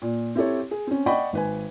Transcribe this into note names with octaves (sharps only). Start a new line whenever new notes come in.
A#2
C4 E4 G4 A4 C#5
G#4
C4 C#4
D5 D#5 F#5 G5 B5 C#6
G#1 B4 G#5